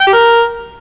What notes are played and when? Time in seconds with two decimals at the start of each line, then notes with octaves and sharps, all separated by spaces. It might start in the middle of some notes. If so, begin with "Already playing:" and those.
0.01 G5
0.07 G4
0.13 A#4